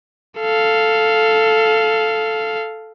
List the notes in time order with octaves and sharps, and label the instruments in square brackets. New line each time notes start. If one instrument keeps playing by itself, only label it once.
[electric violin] A4 F5